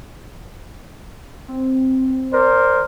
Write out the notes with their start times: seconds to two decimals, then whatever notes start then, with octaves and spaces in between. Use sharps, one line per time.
1.48 C4
2.33 A#4 C5 D5